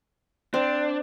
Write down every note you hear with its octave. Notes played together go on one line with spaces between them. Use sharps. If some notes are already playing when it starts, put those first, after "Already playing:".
C4 D4